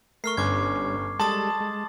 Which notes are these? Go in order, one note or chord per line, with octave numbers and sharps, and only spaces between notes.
A3 A#4 C#6 F6 C7
G1 G2 C#4 D6 G#6
G3 G#3 A4 A5 C6 D#6 A6
G#3